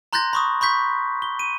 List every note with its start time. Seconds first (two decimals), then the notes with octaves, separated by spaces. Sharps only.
0.13 A#5 C6 F#6 G6 A6 A#6
0.33 B5 C#6 D#6
0.61 B5 C#6 G6 B6
1.22 G7
1.39 D#7